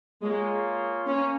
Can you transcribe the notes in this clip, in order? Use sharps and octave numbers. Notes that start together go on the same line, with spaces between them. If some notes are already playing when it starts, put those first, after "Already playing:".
G#3 A#3 F4 G#4 C#5
A#3 C#4